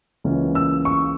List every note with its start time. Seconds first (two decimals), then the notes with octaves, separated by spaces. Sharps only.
0.24 C#2 C#3 E3 A#3 C#4
0.55 E6
0.85 C#6